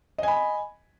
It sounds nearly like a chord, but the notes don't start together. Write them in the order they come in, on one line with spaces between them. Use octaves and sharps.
D#5 G#5 B5